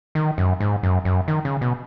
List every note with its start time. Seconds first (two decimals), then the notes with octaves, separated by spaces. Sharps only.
0.15 D#3
0.38 F#2
0.60 G#2
0.83 F#2
1.05 F#2
1.28 D#3
1.45 C#3
1.61 B2